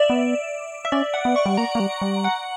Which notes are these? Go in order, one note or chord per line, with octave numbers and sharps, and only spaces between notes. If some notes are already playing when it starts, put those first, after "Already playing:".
Already playing: D5 E5
B3
E5
C#4 D5
F#5
B3
C#6
G3
A#3 A#5
A#3
G3
G3
F#5